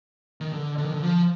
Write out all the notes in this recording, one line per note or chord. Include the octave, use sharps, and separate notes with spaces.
D#3
D3
D3
D#3
D3
F3